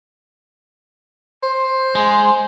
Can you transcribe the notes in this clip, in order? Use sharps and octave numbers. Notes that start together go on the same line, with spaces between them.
C5
G#3